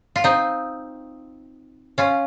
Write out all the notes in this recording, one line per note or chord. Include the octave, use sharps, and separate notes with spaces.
F4
C4 D#4
C#4 F4